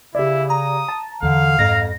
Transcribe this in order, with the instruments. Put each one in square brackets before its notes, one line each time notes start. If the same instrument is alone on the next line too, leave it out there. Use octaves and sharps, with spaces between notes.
[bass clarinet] C#3 [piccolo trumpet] E4 [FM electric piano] G4 D5
[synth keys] A#5 [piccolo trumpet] D#6
[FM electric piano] A5
[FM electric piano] E2 [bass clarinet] D3 [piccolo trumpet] F5
[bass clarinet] F2 [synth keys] G#2 [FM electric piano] A#6